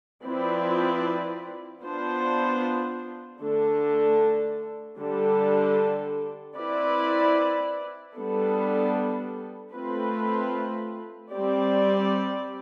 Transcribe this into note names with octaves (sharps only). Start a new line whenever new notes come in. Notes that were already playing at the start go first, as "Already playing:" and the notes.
F3 C4 E4 B4 D5
B3 D4 F4 C5
D3 A3 D4 A4
D3 G3 D4 A4
C4 E4 B4 D5
G3 B3 D4 A4
A3 C4 F4 B4
G3 C4 G4 D5